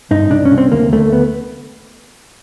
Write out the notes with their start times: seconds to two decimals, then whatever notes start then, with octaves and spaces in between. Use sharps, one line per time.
0.11 G2 D#4
0.31 C2 D4
0.45 C#4
0.52 C2
0.58 C4
0.72 D2 A#3
0.92 D2 A3
1.12 B3